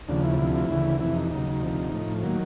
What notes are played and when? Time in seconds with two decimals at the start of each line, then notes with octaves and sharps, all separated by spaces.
0.08 D#2 C#3 F3 D4
0.23 E4
0.38 D2 C3 F3 E4
0.55 E4
0.70 D2 C#3 E3
1.00 F2 C3 E3 E4
1.15 D#4
1.31 D#2 C#3 F#3 D#4
1.61 D2 C3 F3
1.93 A2 F3
2.23 D#3 F#3 A#3